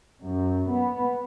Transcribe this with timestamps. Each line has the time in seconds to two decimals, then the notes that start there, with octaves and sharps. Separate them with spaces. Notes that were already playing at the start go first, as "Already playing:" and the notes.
0.25 F#2
0.71 B3